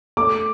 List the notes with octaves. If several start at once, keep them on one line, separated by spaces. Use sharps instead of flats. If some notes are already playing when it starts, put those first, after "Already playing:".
A3 D6